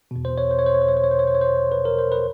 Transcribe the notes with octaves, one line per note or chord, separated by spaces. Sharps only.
E2 B2
C5
C#5
C5
C#5
C5
C#5
C5
C#5
C5
C#5
C5
C#5
C5
C#5
C5
B4
A#4
C5
B4